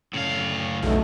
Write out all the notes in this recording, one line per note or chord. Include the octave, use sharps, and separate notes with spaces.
F#2 A2 C#3 F5
B1 E2 B2 A3